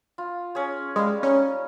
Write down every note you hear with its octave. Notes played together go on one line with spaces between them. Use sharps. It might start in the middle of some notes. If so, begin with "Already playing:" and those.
F4
C#4 G#4 C#5
G3 G#3 F5
C#4 D#4